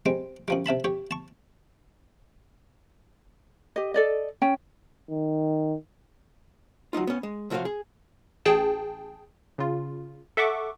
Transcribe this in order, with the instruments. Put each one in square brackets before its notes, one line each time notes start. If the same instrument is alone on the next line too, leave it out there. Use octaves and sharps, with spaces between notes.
[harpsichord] G3 G#3 C4
F#2 F3 G3
C3 E5 A5 B5
G4 C#5
A5 C#6
[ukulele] G4 D#5
A4 D5 D#5
C#4 G5
[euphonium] D#3
[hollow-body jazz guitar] F#3 C#4 D#4 F4
B3 C#4
G#3
C3 F3 F#4 B4 C#5 F5
G#4
[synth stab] A1 G#4 G5 A5
C#3 F4
A4 E5 F#5 C#6 D6